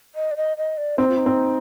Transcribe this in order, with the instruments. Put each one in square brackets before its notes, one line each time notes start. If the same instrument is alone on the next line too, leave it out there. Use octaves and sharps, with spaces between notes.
[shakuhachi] D#5
D5
D#5
D#5
D5
[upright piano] C4 [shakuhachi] D#4
[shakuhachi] F4
D#4
[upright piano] C4